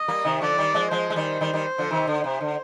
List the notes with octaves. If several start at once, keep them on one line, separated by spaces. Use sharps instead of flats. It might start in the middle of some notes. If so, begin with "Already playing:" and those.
Already playing: D#5
G3 A#3
C3 D#3
D3 F3 D5
D#3 G3
F3 G#3
F3 G#3 C5
G#3
D#3 G3
D#3 G3
D#3 G3
D3 F3
C3 D#3
D3
C3
D3